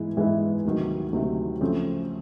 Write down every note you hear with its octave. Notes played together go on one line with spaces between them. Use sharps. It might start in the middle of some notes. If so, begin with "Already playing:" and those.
Already playing: G#2 E3 G#3 B3 E4
G#2 E3 G#3 B3 E4
D2 C3 D#3 F#3
D2 C3 D#3 F#3
C#3 F3 A3 C4